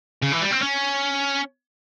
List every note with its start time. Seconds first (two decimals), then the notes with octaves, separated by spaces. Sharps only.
0.23 C#3
0.33 E3
0.43 G3
0.52 C4
0.63 C#4